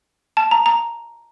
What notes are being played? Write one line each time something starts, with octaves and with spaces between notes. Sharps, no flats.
A5
A#5
A#5